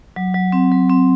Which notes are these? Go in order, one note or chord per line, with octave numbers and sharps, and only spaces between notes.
F#3
F#3
C4
F#3
C4